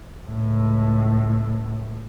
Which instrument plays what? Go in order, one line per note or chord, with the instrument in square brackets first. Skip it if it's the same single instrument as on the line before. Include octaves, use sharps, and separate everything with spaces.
[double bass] C#2 A2